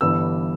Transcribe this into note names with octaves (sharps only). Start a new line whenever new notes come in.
G1 G2 E3 E6